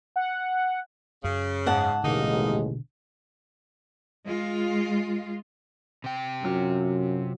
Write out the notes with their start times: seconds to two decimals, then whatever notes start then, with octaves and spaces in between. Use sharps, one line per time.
0.16 F#5
1.24 F#2 C#3
1.66 G#2 F#5 A5
2.04 A1 D#2 B2 D3 G#3 A#3 D#4
4.24 G#3 F4
6.04 C3 G5
6.43 F#2 F#3 F4 F6